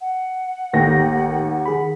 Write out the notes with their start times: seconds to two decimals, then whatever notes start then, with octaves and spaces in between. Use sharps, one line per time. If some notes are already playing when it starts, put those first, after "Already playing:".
0.01 F#5
0.73 A1 D#2 D#3 A3 G5 A#6
1.66 D#3 G#4 B5